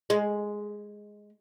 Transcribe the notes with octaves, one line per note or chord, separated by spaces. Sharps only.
G#3